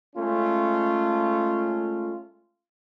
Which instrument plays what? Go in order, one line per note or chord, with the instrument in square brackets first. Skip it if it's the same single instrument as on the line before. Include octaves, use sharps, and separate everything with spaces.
[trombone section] G#3 A3 C#4 F4